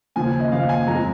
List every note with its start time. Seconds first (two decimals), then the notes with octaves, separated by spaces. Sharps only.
0.16 D#2 C#3 F3 G#5
0.40 D#5
0.52 D#2 C#3 F3 F5
0.69 G#5
0.87 F2 F3 G#3 A#5